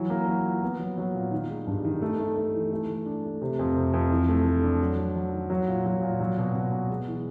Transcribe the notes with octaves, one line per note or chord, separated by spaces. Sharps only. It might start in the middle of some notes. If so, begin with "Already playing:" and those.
Already playing: E3 F#3
A#3
F#3
F4
B3
F#3
F#3
A#2
D#3
G#3
G2
D#3
A3
A3
A3
E3
A3
A3
D4
A3
C3
F2
C3
F2
E3
A3
A3
D4
F#3
F#3
F#3
D#3
F#3
A#2
F#3
A#2
F#3
B2
B2
B3
G#3
E3